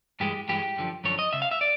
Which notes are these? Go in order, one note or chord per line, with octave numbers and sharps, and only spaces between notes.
G2 E3 G#3 G4
G2 E3 G#3 G4
F#2 D3 F3
F#2 D3 F3 C#5
D#5
C#2 C#3 E5
F5
E5
D5